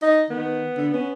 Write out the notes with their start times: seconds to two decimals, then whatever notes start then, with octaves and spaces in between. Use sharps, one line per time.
0.02 D#4 D#5
0.30 D#3 B3
0.77 D3
0.94 B3 C#4